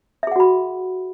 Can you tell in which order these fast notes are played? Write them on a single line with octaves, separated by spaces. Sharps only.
E5 G#4 F#5 F#4 B5